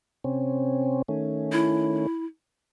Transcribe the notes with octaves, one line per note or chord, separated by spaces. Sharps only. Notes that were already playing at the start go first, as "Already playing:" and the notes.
C3 C4 C#4
D#3 A3 C#4
E4